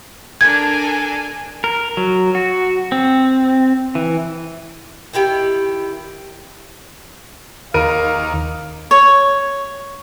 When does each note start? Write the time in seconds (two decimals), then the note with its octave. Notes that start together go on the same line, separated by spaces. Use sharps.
0.41 D4 A4 A#4 G#5 G#6
1.64 A#4
1.97 F#3
2.35 F#4
2.92 C4
3.95 E3
5.13 D#3 E4 G4 G5
7.74 D#2 A#4 F5 D#7
8.91 C#5